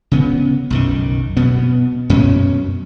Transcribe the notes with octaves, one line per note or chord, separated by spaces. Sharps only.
C#3 B3
B1 F#2 D#3
B2 B3
F#2 B2 C#4